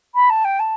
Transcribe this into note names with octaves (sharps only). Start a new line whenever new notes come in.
B5
A5
G5
A5